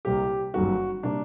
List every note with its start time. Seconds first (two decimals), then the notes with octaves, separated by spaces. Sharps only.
0.05 C2 C3 G3 A#3 G4
0.54 G1 F#2 D#3 G3 A#3 F#4
1.03 C3 G3 A#3 D4